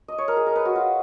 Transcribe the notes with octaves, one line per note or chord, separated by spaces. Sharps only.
D#5
C#5
A#4
G#4
A#4
B4
F#4
F4